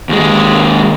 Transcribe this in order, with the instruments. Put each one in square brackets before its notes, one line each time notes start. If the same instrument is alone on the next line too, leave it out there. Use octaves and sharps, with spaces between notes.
[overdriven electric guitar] D#2 G#3